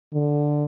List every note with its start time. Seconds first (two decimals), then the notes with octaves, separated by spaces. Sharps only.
0.14 D3